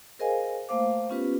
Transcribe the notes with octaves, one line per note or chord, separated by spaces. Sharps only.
G#4 A#4 C5 D#5 F5 G#5
A3 A#3 C5 F5 D6
B3 C#4 F4 G4 B4